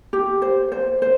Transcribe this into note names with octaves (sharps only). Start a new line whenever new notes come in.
G4
C5
C5
C5